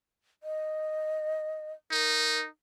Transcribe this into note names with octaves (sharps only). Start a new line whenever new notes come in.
D#5
D#4 A#4